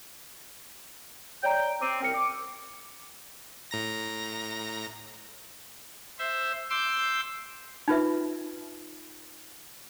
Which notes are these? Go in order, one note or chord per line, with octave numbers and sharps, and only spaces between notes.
C#5 D5 G5 A#5
C4 D6 D#7
C2 C4 A#4 G5 C#7
D6
A2 A#5 A#6
C5 E5
C6 D6 E6 G6
D#4 F4 B4 E5